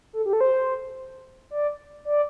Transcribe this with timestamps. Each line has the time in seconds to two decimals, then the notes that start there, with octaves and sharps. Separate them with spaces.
0.13 A4
0.26 G4
0.33 A4
0.41 C5
1.51 D5
2.05 D5